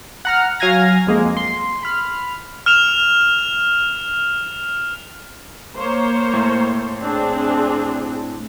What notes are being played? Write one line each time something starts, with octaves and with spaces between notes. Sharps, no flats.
F#5 A#5 F6
F#3 F5 G#5 F6 G#6 A#6
F2 G#3 A#3
C6
B5 F6
F6 E7 F7
A#3 C5 C#5
A2
C4 D4 G#4